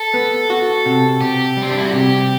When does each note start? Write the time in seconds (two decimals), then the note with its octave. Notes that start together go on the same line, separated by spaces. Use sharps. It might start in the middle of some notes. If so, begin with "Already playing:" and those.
Already playing: A4
0.14 B3
0.50 F#4
0.86 C3
1.21 C3 G4
1.57 G3
1.62 C4
1.70 D4
1.77 E4
1.85 F#4
1.92 C3 G4